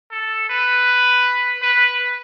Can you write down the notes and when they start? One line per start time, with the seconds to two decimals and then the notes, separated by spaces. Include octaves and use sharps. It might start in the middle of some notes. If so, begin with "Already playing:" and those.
0.12 A4
0.50 B4
1.63 B4